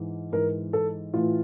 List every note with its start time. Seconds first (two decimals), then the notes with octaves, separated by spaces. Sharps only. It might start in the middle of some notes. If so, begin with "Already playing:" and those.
Already playing: G#2 E3
0.32 G#2 E3 A#4
0.73 A4
1.14 A2 E3 F4